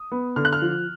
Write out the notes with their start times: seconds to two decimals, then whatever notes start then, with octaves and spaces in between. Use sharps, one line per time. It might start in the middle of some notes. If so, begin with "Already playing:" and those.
Already playing: D#6
0.12 B3
0.36 D3 F6
0.45 F#6
0.53 F6
0.62 F3